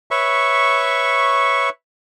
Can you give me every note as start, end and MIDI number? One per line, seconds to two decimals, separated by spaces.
0.11 1.69 71
0.11 1.69 73
0.11 1.69 76
0.11 1.69 85